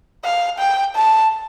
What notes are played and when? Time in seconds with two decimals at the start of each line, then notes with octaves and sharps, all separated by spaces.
0.25 F5
0.59 G5
0.96 A5